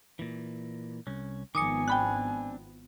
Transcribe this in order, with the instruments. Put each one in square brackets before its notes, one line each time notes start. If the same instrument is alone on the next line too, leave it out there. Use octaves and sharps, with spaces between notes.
[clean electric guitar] A#2 E3
C2 C#4
[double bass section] G#1 F3 B3 [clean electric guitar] D#3 [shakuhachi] G#5 [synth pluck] D6 D#6 C#7
[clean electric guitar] C4 D4 [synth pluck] G5 B5 F#6